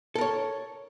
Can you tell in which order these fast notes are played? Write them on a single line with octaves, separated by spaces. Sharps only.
A4 A#4 C#5